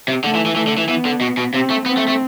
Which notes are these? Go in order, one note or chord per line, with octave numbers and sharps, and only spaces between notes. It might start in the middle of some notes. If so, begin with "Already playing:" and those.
C3
D3 A3
E3
E3
E3 A3
D3
E3
E3 B3
D3
B2
B2
C3 C4
A3
B3 C4
A3
A3